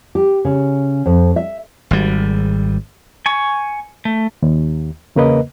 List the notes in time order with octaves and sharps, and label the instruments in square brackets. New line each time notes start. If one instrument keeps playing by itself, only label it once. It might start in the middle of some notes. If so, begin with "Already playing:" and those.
[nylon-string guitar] G4
C#3
F2
E5
[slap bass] G#1 G3
[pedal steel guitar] G#5 C#6
A3
[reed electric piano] D#2
E2 C#3 A#3 A#4 B4 D#5